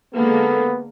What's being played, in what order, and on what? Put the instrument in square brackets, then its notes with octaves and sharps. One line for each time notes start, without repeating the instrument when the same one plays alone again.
[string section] D3 G#3 A#3 [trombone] B3 [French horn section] A4